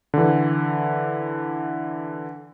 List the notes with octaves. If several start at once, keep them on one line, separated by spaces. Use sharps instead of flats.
D3 E3